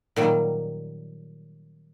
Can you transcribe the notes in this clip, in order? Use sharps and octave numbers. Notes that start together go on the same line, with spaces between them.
A#2 D#3 F#3 G3